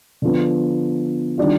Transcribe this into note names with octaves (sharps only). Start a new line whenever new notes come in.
D3 F3 B3
D#3 G3 D4 F4